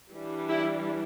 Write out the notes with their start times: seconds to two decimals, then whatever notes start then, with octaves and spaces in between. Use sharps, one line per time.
0.11 E3 G3 D4
0.48 E4 G4